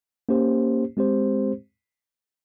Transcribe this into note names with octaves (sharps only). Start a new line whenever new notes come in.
A#3 C#4 G4 C5
G#3 C4 G4 C5